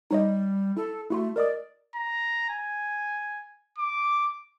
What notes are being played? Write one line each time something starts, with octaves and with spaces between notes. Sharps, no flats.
G3 D#4 C#5 D#5
E4 A4
A3 E4 F#4 C6
A#4 D5 D#5 D#6
A#5
G#5
D6